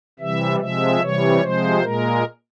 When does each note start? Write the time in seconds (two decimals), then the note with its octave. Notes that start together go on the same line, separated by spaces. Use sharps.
0.19 C3 E3 G3 E5
0.60 C3 F3 G#3 E5
1.00 C3 E3 G3 C#5
1.41 C3 F3 G#3 C5
1.82 A#2 G#3 A#4